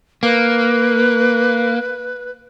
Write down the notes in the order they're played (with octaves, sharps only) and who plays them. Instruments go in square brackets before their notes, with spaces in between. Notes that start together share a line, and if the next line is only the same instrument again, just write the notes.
[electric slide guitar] A#3 [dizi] B4